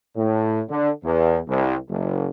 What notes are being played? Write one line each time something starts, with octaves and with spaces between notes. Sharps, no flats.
A2
D3
E2
C2
F#1